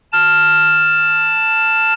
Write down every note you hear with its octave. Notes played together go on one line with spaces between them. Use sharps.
A5 F6